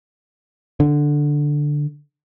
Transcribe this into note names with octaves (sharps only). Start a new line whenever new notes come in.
D3